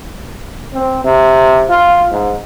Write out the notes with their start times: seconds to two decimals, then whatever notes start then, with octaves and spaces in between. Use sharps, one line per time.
0.74 C4
1.05 C3
1.70 F4
2.11 G#2